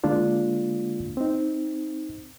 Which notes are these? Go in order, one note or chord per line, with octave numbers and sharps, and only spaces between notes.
D3 G#3 A#3 D4 F4
C4 D#4